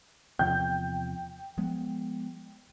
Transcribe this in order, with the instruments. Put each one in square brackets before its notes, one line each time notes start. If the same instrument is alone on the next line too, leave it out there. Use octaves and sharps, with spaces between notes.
[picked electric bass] E2 C3 F3 [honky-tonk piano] G5 G6
[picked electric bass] F3 G#3 B3